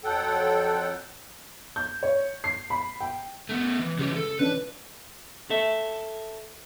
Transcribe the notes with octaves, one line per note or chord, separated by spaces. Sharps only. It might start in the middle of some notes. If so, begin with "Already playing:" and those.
F2 F#3 A4 F#5 G5
G6
C#5
C7
B5
G5
A3 B3
E3
C#3 E3 G3 G4
A4
E3 C#4 D4 B4
A4 E5